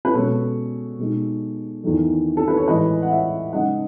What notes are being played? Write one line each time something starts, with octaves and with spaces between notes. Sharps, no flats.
B4
B2 G#3 C#4 A4 C#5
B2 G#3 D#4
E2 D#3 A3
A4
B4
C#5
A2 E3 G#3 B4 D#5
F#5
C#5 E5
C#3 G#3 D#4 D#5 F#5